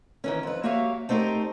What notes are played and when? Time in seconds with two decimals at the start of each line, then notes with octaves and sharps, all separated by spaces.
0.24 D#3 E3 C#4
0.43 F2 B4
0.63 A#3 F#4 G4 C#5 E5 F5
1.09 A3 C4 D#4 F#4 G4 A#4